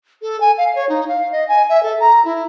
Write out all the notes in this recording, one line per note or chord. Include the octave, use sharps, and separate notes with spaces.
A4
G#5
F5
C#5
D#4
F5
D#5
G#5
E5
A4
A#5
E4